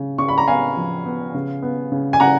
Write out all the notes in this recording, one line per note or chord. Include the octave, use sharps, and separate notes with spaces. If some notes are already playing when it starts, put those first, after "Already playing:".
Already playing: C#3
C#3 C#6
B5
A#5
B3 F5 G#5
F3
B3
C#3
B3
C#3
G#5
C#3 F#5 A#5